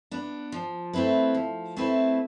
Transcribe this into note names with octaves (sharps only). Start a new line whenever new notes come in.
B3 D4
F3
A3 C4 E4 B4
F3
A3 C4 E4 B4